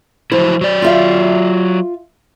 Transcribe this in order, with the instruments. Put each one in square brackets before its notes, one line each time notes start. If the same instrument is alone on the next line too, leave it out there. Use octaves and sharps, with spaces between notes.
[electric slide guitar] F3 F#3 E4 [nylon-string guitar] C5
[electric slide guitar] F#3 D5
[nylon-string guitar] F4 E5 F5